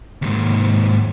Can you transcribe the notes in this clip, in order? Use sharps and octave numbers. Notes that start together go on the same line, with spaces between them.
D#2 G#2